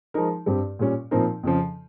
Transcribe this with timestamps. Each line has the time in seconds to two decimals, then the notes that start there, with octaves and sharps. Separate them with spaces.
0.14 F3 G#3 D#4 A#4
0.46 G2 G3 C4 G4
0.79 A#2 G3 C#4
1.11 A#2 F3 C4 D#4 A#4
1.43 F2 C#3 F3